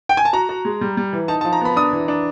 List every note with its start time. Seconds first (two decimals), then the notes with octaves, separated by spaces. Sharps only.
0.09 G5
0.17 G#5
0.25 A5
0.33 F#4 A#5
0.49 F#4
0.65 G#3
0.81 G3
0.97 G3
1.13 E3
1.28 D#4 A5
1.41 A5
1.45 F3
1.53 A#5
1.61 B3 B5
1.76 D4 D#6
1.93 E3
2.08 D4